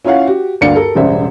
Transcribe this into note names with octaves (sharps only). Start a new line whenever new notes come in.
C#4 E4 F4 C#5 F5 F#5
F#4 G4
D2 G2 A#3 D5 F5 C#7
G4 A4 A#4
E1 A1 C#3 G3 C5 E5